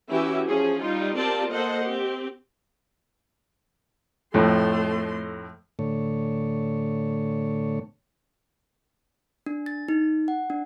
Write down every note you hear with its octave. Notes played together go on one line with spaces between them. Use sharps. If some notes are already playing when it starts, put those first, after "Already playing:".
E3 C#4 E4 F#4 G4 E5
F3 C#4 G#4
G3 D#4 F4
C4 F4 G4 A#4 D5 A5
A#3 A4 C5 D#5 F#5
C4 G4
F2 A2 A3 C6
A2 D3 A3 C#5
D4
A6
D#4
F#5
D4